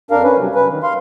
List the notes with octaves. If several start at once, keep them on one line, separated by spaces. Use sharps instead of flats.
F2 D4 A#4 F5
C#4 B4
C3 F#3 G3
B4
D#3
F5 C6